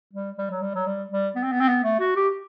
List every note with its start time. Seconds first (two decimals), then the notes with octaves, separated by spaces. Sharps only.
0.13 G3
0.38 G3
0.50 F#3
0.62 G3
0.75 F#3
0.87 G3
1.12 G3
1.36 B3
1.43 C4
1.52 B3
1.61 C4
1.68 B3
1.84 A3
2.00 F#4
2.16 G4